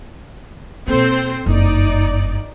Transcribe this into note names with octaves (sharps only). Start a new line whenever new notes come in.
B2 A#3 C4 A4 C5
F#1 G2 D#4 D5